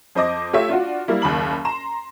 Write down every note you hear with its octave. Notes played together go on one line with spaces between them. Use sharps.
F2 C5 D#5 D6 A#6
A3 F4 G4 C#5 E5
D4 F4 F#4
G3 A#3 E4
F#1 D#2 D#3 B5 F#7
A#5 C6 E7